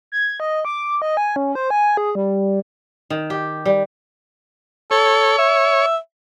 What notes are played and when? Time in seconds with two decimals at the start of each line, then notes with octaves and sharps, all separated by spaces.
0.12 G#6
0.40 D#5
0.65 D6
1.02 D#5
1.17 G#5
1.36 C#4
1.55 C5
1.70 G#5
1.97 G#4
2.15 G3
3.10 D#3
3.30 G4
3.66 G3
4.91 A4 C#5
5.38 E5